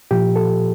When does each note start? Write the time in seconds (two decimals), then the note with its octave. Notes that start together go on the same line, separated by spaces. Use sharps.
0.11 A#2 F3 G4
0.36 A4